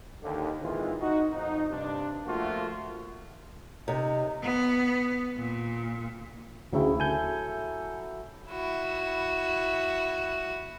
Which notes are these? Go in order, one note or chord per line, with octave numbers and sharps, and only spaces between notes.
D#2 D3 G4
A#2 D#3 E3 G#3 C4 F4
D#4 F#4
F2 D#4
G2 C3 D4
F3 A3 A#3 F4 F#4
C3 D#4
B3
A#2
D2 C#3 F#3 E4 G5
A4 G#5 G6
E4 F#4